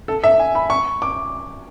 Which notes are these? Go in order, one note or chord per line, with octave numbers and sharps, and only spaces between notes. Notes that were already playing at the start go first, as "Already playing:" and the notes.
A4
E5
G#5
B5
C#6
D6